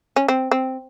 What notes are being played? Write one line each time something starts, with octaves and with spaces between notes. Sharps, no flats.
C#4
C4
C4